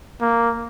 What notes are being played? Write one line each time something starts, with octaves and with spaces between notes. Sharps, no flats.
A#3